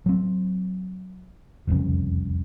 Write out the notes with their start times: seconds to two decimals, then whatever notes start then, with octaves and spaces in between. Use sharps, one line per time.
0.06 F#3 C4
1.67 E1 C2 F2 C#3